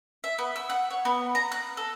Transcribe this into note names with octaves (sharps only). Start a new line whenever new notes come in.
E5
B3
E6
F#5
C#5
B3
A#5
F#6
A4